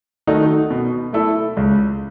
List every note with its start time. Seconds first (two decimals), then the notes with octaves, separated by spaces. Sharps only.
0.27 D#3 A3 D#4 F#4
0.71 B2
1.13 A3 E4 A4
1.57 C#2